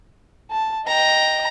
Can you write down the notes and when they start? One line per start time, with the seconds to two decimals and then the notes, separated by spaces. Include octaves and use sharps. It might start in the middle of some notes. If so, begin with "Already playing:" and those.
0.51 A5
0.87 D#5 G5 A#5